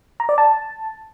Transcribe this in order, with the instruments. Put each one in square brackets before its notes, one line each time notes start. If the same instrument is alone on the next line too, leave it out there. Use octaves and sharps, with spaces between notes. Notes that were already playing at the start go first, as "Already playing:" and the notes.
[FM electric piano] A#5
D5
A5